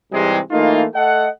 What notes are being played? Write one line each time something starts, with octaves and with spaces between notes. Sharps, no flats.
G#2 C3 E3 G3 G#3
E3 A3 A#3 D#4 F4
A3 A4 D#5 F#5